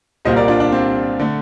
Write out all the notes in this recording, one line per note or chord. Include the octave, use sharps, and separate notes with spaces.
C2 A#2 G3 A#3 C5 D#5
A#4 D5
D4 F4
D4
C4
D3 A3